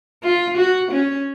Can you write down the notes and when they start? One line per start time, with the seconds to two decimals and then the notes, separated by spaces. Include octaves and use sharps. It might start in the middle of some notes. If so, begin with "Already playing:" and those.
0.23 F4
0.57 F#4
0.91 C#4